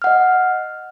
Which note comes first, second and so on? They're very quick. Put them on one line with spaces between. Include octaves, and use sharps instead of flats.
F6 F#5 D#5